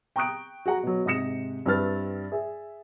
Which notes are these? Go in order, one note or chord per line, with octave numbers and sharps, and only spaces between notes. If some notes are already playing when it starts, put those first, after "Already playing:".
G5 A#5 C#6 D#6 F#6 D7
F#4 G#4 F#5 A#5
B2 F#3
G#2 C3 D#6 A#6 C#7 E7
G2 C4 E4 B4 F6 A6
G#4 E5